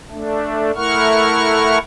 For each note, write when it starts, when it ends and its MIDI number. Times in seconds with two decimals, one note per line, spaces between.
0.10 0.71 57
0.10 0.71 62
0.76 1.78 57
0.76 1.78 64
0.76 1.78 70
0.76 1.78 78
0.76 1.78 85
0.76 1.78 89